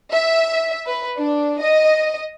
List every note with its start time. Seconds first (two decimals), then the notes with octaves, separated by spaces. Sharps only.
0.12 E5
0.87 B4
1.17 D4
1.61 D#5